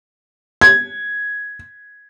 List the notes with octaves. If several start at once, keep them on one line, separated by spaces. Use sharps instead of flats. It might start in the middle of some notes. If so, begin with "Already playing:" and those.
G#6